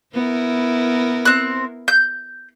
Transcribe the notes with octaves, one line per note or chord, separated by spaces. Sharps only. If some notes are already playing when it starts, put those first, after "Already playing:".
B3 E4 A#4
C4 F#6
G6